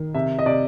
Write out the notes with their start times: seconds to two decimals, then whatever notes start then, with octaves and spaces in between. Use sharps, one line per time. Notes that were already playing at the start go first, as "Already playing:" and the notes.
Already playing: D#3
0.14 C3 E5
0.39 D#5
0.46 C3 D5